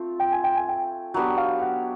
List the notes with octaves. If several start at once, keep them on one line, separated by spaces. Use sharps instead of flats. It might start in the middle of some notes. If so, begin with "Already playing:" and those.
Already playing: A3 C4 F4
G5
G#5
G5
G#5
G5
F#3 B3 D4 G4 F#5
F#5
F5
F#5